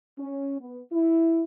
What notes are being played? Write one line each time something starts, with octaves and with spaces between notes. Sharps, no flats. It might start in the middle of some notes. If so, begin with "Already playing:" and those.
C#4
B3
E4